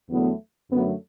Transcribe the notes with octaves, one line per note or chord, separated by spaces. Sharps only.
E2 D3 F#3 A3 B3
F#2 D3 F#3 A3 B3